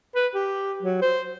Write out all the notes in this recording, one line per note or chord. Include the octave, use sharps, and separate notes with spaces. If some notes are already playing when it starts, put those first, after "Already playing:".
B4
G4
F#3
C5